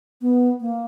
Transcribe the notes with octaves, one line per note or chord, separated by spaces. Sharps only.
B3
A#3